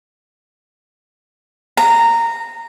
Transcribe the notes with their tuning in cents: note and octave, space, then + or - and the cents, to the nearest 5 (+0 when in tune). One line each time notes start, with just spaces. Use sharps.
A#5 -15